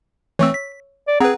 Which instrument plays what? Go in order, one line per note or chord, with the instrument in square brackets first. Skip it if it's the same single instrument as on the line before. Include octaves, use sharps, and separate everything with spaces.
[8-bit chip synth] E3 A3 C4 [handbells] C#5 C#6 E6
[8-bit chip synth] B6
[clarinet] D5
[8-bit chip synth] C4 B4 [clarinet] G#4 [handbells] F#5 A#5